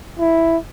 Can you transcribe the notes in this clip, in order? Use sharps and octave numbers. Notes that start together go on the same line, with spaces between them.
E4